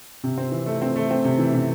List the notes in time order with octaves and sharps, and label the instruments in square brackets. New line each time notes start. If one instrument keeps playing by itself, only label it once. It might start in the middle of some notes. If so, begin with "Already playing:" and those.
[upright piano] C3
C4
E3
A3
C4
A3
C4
C3
E3
C3